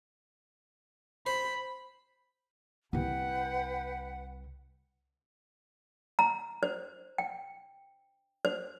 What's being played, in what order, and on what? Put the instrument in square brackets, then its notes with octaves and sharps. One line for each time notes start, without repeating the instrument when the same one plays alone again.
[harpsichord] C5 [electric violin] B5
[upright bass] C2 E4 [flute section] B4 F#5 G5
[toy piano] A#5
C5
G5
C5